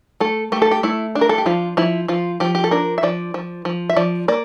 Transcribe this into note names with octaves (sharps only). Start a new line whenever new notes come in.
A3 A4
A3 G4
A4
G4
A3 E4
D4
A#4
A4
G4
F3 F4
F3 E4
F3 F4
F3 G4
G4
A4
D4 A#4
E5
F3 D5
F3
F3
E5
F3 D5
A#3 D5